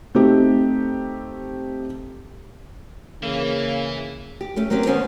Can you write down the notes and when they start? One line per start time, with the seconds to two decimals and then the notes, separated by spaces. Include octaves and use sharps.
0.15 A3 C4 D#4 G4
3.23 C#3 E3 A#3
4.41 G4
4.56 A3 C#4 G4
4.70 F#3 A#3 C4 C#4 G4
4.86 D#2 B3 C#4 C5 C#5 G#5